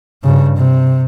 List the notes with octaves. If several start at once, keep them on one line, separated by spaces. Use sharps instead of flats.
G2 C#3
C3